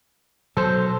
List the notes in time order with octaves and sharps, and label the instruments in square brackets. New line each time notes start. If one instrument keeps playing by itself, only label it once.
[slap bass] B2 F#3 [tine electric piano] A4 C5